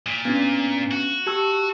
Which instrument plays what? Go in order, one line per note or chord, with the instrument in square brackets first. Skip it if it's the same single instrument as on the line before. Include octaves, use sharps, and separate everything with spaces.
[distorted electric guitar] A#2
[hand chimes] B3 C#4 D4
[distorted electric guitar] F#4
[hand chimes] G4 A5 E6